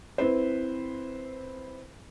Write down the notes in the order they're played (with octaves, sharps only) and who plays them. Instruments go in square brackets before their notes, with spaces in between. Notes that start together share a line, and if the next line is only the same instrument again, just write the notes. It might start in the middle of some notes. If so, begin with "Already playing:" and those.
[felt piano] C4 E4 B4 C5